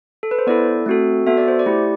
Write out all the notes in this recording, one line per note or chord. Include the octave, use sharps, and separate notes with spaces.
A4
B4
C5
B3 E4 A4 D5
A3 C4 F#4 A4
B3 F#4 A4 E5
D5
C5
D5
A3 E4 G4